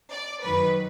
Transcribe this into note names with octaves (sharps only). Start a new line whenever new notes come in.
D5
F#2 D#3 F#3 B4